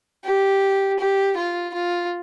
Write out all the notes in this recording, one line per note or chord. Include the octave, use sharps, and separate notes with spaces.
G4
G4
F4
F4